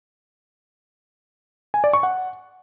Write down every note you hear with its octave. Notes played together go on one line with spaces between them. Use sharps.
G#5
D5
C#6
F#5